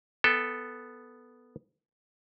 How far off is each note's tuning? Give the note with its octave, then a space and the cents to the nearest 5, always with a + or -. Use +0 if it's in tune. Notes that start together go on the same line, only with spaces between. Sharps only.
B3 +0 A4 +0 G5 +40